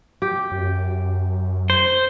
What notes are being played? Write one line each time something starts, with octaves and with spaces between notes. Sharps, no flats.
G4
F#2
C5